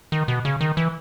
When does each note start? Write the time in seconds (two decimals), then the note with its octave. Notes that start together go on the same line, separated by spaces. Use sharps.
0.12 D#3
0.28 B2
0.45 C#3
0.61 D#3
0.77 E3